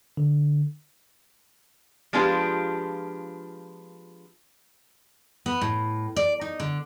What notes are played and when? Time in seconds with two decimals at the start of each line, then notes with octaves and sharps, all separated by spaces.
0.17 D3
2.13 F3 G#3 B3 D4 F4 G4
5.46 B3
5.61 A2
6.16 D5
6.41 D#4
6.60 D3